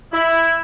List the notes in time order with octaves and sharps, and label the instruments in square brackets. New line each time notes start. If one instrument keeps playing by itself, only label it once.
[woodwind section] E4